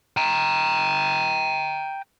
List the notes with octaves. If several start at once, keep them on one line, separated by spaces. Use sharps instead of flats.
G5 A#5